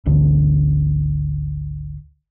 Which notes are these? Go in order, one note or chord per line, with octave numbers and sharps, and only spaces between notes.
G#1 D2 D3